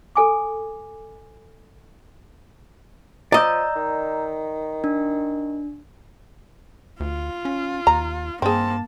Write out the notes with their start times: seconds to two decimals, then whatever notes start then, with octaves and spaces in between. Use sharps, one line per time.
0.16 A4 G#5 D6
3.32 F3 D5 D#5 A#5 E6 G6
3.76 D#3
4.84 D4
7.00 D2 F4
7.45 C#4
7.87 D#2 A#5
8.42 G2 A#3 C4 G#4 A5